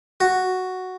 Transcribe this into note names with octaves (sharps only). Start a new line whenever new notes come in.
F#4